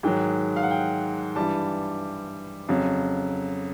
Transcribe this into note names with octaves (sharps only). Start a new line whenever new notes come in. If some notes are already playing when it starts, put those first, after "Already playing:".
G#2 D#3 F#3 G5
F5
F#5
G5
G2 E3 G3 A5
F2 C#3 F#3